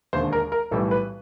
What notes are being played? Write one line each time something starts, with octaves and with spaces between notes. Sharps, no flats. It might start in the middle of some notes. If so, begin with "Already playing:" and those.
E1 D#2 D3 C5
A#4
A#4
B1 A2 E3 G3 A4
B4